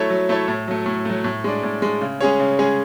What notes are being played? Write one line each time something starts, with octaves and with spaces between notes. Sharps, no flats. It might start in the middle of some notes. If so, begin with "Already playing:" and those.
Already playing: F#3 A3 E4 A4 C#5
F#3
A3 E4 A4 C#5
A2
F#3 A3
A2
F#3 A3
A2
G#3 D4
A2
G#3 D4
C#3
G#3 C#4 G#4 C#5
C#3
G#3 C#4 G#4 C#5